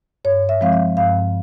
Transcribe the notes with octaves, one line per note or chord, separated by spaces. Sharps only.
G2 C#5
E5
F3 G#3 C4 F5
E5
G2 F5